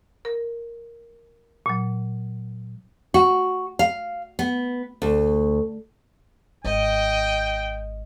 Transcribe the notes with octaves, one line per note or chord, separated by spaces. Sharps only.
A#4
A#2 F#3
F#4
F5
B3
D2
G#1 D#5 G5